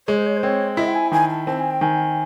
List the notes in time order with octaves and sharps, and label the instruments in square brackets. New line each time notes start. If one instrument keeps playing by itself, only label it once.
[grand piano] G#3 [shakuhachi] C#5
[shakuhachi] C5
C#5
C5
[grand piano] C4 [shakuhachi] C#5
[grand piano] E4 [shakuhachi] D#5
[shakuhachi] G5
G#5
[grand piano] D#3 [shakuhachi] G#5
[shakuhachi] A5
[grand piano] C4 [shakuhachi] A5
[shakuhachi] G#5
G5
[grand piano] D#3 [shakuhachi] G#5